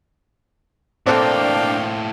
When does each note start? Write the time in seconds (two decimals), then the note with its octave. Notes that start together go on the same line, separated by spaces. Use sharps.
1.06 A2 A#3 C4 D4 A4 F5 G5